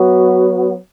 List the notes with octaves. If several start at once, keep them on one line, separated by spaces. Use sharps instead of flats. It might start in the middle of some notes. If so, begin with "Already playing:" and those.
Already playing: F#3 B3 F#4